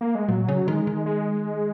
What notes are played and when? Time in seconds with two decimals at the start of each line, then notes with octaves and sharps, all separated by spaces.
0.01 A#3
0.15 G#3
0.28 A#2 F#3
0.49 C#3
0.67 D#3 G#3
0.87 D#3
1.06 G#3